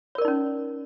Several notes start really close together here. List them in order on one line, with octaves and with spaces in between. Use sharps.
C#5 A#4 D5 D#4 C#4